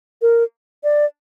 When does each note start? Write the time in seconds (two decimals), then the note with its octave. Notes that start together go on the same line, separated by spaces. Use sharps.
0.22 A#4
0.84 D5